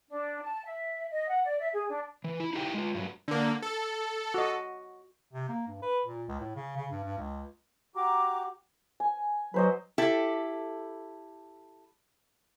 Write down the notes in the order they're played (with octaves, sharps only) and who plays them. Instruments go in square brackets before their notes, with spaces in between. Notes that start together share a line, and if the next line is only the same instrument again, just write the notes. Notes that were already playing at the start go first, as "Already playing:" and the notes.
[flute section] D4
A5
E5
D#5
F#5
D5
E5
G#4
D4
[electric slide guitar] E3
E4
D#4 E4 G4 F#5 G5
G#3 F4
G2 F#3
[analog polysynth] D3 A#3
A4
[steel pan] F#4 D#5
[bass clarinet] C3
A#3
G2
B4
A#2
C#2
A2
C#3
C#3
G2
G2
C#2
[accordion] F#4 G4 [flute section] A#5 D6
[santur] G#5
[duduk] F#3 [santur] B4 C5 D#5
[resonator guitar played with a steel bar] E4 G4 A4